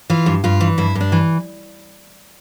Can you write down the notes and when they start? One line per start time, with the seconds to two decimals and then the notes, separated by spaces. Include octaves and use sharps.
0.10 E3 F4
0.26 G2
0.44 G2 F4
0.61 E3
0.78 G2 E4
0.95 G2
1.01 D4
1.12 E3